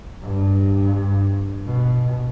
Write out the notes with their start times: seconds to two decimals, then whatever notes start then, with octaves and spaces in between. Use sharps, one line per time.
0.23 G2
1.66 B2